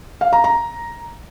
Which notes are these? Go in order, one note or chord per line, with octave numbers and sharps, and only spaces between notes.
F5
A#5
A#5